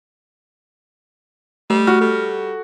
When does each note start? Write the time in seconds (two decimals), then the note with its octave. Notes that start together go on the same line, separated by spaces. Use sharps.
1.70 G3 A3
1.87 F#4 F6
2.01 G3 A4